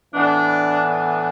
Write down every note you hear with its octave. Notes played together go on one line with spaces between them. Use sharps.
A2 E3 B3 D4
D4